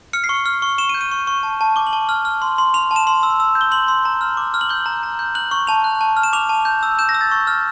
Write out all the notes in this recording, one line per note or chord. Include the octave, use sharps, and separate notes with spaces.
F6 C#7
C7
C#6
F6
C#6
C#6 E7
D#7
G6
D#7
C#6
C#6
A5
A5
D6 G7
F#7
A5 G7
F6
F6
C6
C6
C6 F7
A5
E7
C6
E6
E6
G6
G7
C6 F#7
C6
A#5
F6
D6
F6
F#7
G6 G7
A#5
A#5
G6
F#6 F#7
C#6
A5 F7
F#6
A5
F6
E7
D6 F7
A5
G6
E6
G6 E7
A#6
E6
A6
C#6
F6